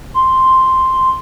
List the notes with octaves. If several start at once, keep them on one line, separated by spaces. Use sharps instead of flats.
C6